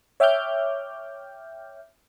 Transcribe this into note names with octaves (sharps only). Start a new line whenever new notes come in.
C#5 E5 G5 D6 F6 G6